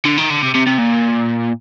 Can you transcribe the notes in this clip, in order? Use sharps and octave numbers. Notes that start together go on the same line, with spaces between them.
D3
D#3
D3
C3
C3
C3
A#2